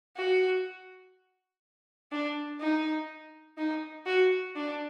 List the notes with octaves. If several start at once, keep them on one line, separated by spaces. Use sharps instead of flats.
F#4
D4
D#4
D#4
F#4
D4